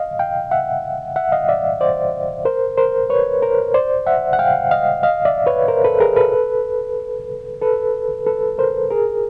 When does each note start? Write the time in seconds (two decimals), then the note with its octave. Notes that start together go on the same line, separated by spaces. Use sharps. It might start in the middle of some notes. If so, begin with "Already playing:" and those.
Already playing: D#5 F5
0.19 F5 G5
0.51 E5 F#5
1.16 E5 F#5
1.32 D#5 F5
1.49 D5 E5
1.81 C5 D5
2.45 A#4 C5
2.78 A#4 C5
3.10 B4 C#5
3.42 A#4 C5
3.74 C5 D5
4.06 E5 F#5
4.33 F#5
4.39 F5 G5
4.71 D#5 F5
5.03 D#5 F5
5.25 D5 E5
5.47 B4 C#5
5.68 A#4 C5
5.84 A4 B4
6.00 G#4 A#4
6.16 A4 B4
7.62 A4 B4
8.26 A4 B4
8.58 A#4 C5
8.91 G#4 A#4